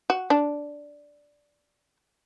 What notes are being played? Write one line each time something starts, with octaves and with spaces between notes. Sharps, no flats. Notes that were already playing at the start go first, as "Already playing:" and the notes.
F#4
D4